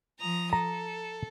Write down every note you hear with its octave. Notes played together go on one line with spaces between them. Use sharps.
F3 A#5 D#6
A4 A#5